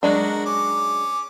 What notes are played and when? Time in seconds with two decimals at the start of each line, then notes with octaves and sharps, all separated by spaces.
0.03 F#3 G#3 D4 F#4 A#4
0.45 C#4 D6